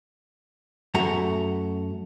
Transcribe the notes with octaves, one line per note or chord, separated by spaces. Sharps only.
F#2 A3 F#4 A#5